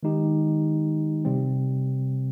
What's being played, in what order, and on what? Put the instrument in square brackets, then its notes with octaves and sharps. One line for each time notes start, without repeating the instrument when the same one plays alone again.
[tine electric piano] D#3 G#3 D#4 G4
C3 G3 C4